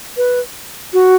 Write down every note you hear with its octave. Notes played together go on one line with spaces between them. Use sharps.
B4
F#4